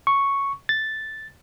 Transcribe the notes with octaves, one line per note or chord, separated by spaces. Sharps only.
C#6
A6